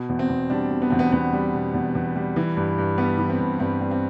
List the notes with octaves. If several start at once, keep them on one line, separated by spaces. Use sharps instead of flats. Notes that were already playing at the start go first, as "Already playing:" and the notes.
Already playing: B2
E2
C4
E2
G3 D4
B2
B3
E2 C4
B3
E2 B3
G3
B2
E2
E2
G3
E3
G2
G2
G3 B3
E3
C4
G2
G2 C4
G3
C4